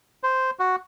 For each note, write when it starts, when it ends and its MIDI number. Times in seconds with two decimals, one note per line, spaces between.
0.23 0.51 72
0.59 0.76 66